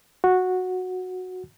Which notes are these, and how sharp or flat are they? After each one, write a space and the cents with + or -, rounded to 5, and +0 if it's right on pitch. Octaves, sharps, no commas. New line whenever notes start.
F#4 -10